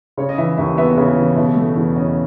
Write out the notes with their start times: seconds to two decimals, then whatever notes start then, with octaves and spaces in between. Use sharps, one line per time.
0.17 C#3 C#5
0.29 D#5
0.38 E3 E5
0.57 D#2 E5
0.78 B3 E5
0.97 C#3
1.17 E3
1.36 B2 E5
1.56 A3
1.76 E2
1.96 C#4 D#5